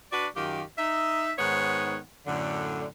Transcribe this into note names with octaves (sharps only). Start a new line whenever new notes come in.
D4 F#4 B4 D5
F#2 D#3 F4 G4
D#4 E5
G#2 D#3 B3 C#5 F#5
F#2 A2 D3